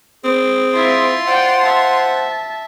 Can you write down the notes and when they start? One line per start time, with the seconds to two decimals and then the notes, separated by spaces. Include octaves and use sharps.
0.24 C4 G#4
0.73 E4 F4 E5 C6
1.28 C5 D5 F#5 G5
1.60 E5 A5